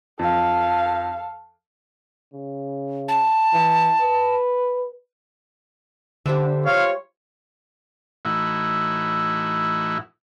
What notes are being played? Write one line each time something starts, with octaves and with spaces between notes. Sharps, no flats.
F2 A4 F5
C#3
A5
E3
B4
D3 G3 C5 E5
F4 C#5 F5
A2 E3 D#4 E4 F#4